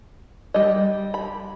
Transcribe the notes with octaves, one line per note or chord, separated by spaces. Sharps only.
G3 D#5
B5